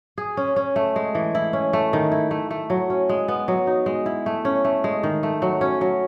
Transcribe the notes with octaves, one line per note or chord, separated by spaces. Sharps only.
G#4
C#4
C#4
A3
G#3
E3
E4
C#4
A3
D#3
E4
A3
A3
F#3
C#4
G#3
B3
F#3
D#4
G#3
E4
A3
C#4
A3
G#3
D#3
A3
F#3
C#4
F#3